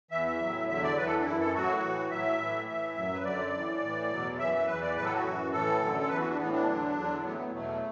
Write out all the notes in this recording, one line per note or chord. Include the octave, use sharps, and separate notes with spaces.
E2 E3 E5
E5
A2 F#3
E2 D3 F#3 E5
D5
E2 E3 B4
A4
D4
F#2 E3 E4
A4
A2 F#3 F#4
A2 E3
A2 F#3 E5
A2 E3
A2 E3 E5
F#2 F#3
B4
F#2 D3 F#3 D5
A2 E3
A2 E3
E2 B2 F#3
F#2 E3 E5
E5
E2 E3 B4
D5
A2 F#3 B4
A4
F#4
F#2 E3
A2 E3 A4
F#2 D3 F#3
A4
E2 E3 B4
F#4
D4
A2 E3 B3
D4
E2 D3 F#3
E2 D3 F#3
A2 F#3 B3
A3
B3
E2 B2 F#3 A3